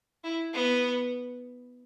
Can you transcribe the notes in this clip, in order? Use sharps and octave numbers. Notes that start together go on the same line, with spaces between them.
E4
B3